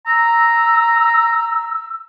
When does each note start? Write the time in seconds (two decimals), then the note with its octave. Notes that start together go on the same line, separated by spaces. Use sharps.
0.07 A#5 E6